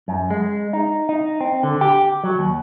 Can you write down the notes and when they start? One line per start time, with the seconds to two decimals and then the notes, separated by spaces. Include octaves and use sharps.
0.08 F#2
0.30 G#3
0.73 D#4
1.09 D#4
1.41 C4
1.63 D3
1.81 G4
2.24 F#3
2.39 D#2